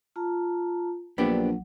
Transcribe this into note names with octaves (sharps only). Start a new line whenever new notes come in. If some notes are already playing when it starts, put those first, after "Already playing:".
F4 A5 A#5
A#1 F#3 B3 D4 G4